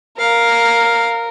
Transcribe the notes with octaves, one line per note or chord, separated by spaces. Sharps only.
A#4 F5